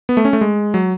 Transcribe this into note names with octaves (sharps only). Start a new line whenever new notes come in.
B3
A3
C#4
A3
G#3
F#3